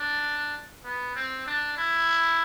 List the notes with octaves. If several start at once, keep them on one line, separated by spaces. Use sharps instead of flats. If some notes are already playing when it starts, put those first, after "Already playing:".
Already playing: D4
B3
C4
D4
E4